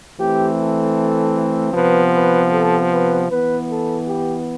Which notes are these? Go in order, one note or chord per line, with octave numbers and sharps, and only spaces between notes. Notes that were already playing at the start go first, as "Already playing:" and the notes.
E3 A3 C4 G4
A4
C3 F3 B3 B4
B4
A4
B4
E3 B3 B4
A4
G4